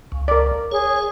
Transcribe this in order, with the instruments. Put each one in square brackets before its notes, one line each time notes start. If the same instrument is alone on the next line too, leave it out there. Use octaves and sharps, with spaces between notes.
[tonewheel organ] C#2
[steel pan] A#4 D5
[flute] G#4 [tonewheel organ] C#5